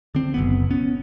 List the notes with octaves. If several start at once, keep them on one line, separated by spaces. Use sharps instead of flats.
D3 C4
F#1 B1 B3
B3 C#4